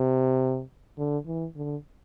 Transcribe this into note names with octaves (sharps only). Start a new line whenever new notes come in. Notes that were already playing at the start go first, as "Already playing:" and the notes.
Already playing: C3
D3
E3
D3